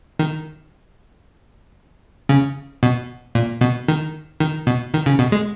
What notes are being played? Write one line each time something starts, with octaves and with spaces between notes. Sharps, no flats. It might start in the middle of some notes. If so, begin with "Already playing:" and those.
D#3
C#3
B2
A#2
B2
D#3
D#3
B2
D#3
C#3
B2
G#3